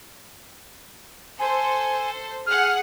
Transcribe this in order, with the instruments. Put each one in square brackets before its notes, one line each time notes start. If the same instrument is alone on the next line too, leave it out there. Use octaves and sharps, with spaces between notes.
[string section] A4 C5 [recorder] G#5
[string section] G#4 F#5 [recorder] F6